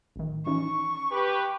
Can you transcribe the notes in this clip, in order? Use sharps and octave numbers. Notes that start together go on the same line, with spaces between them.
A1 D#3
E3 C#4 D#4 C#6
G4 B4